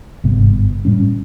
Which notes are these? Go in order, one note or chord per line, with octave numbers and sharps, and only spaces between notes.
G1 G#2 C3 B3
A2 G3 C#4